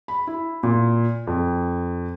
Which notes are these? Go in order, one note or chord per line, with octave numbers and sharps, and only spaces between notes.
B5
E4
A#2
F2